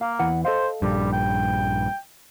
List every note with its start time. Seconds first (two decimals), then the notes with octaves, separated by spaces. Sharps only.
0.01 A#3 F5
0.19 E2 E3 F#5
0.45 A4 C5 D#5 F5
0.82 A#1 G2 G3
1.13 G5